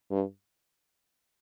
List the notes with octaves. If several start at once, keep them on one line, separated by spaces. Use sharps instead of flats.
G2